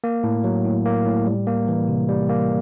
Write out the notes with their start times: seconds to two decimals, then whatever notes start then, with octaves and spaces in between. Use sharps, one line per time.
0.04 A#3
0.24 A2
0.44 F#3
0.64 A2
0.86 A#3
1.06 A2
1.27 G3
1.47 A#3
1.68 E3
1.88 C3
2.09 G3
2.29 A#3